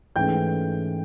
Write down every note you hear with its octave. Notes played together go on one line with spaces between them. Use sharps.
G#2 E3 A3 C#4 G5 G6